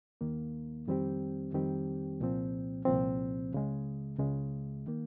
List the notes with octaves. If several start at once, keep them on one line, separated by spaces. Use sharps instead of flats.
D#2 D#3 A#3
F2 D#3 G3 C4 G4
F2 D#3 G3 C4 G4
C2 A#2 F3 C4
C2 A#2 F3 C4
C#2 C#3 G#3
C#2 C#3 G#3
D#3 A#3